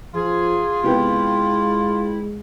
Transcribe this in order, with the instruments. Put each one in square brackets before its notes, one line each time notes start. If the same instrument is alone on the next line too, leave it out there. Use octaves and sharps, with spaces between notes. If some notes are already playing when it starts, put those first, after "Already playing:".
[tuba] F3 [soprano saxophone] F4 [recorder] G#4
[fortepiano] C3 B3 G4 [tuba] G#3 [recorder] E4